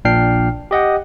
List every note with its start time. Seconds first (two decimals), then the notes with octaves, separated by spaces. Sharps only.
0.05 A#1 A#2 D4 G5 F6 C7
0.71 G4 D#5 F#5 G5